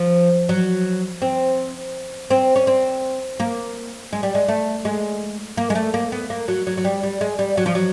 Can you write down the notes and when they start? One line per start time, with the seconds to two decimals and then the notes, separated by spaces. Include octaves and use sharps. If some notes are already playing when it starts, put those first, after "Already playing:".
Already playing: F3
0.49 F#3
1.22 C4
2.30 C4
2.56 C#4
2.67 C4
3.40 A#3
4.13 G#3
4.23 G3
4.35 G#3
4.48 A3
4.85 G#3
5.57 A#3
5.70 G#3
5.75 A3
5.94 A#3
6.12 B3
6.30 A#3
6.48 F#3
6.67 F#3
6.77 F#3
6.85 G3
7.03 G3
7.21 G#3
7.39 G3
7.57 F#3
7.66 F3
7.75 F#3